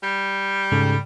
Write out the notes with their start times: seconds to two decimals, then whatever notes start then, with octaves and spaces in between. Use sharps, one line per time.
0.03 G3
0.72 G#2 C#3 A4